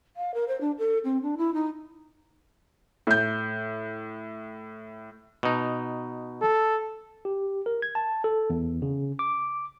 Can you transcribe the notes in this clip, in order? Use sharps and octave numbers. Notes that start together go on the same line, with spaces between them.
F5
A#4
C5
D4
A4
C4
D4
E4
D#4
A2 G6
B2 D#4
A4
G4
A#4
G#6
A5
A4
E2
C#3
D6